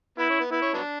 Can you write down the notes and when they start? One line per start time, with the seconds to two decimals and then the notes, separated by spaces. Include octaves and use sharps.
0.18 B3 E4
0.30 C#4
0.40 B3
0.51 B3 E4
0.62 C#4
0.74 F#3 B3 D4